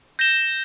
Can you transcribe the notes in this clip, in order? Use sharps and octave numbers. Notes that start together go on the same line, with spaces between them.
G6 A#6 E7 G7